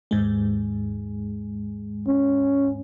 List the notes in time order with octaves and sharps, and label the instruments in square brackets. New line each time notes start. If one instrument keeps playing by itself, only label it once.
[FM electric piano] D#2 G#2 G#3
[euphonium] C#4